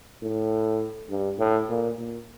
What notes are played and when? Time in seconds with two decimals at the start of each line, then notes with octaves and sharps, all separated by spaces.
0.22 A2
1.10 G2
1.39 A2
1.69 A#2
1.99 A#2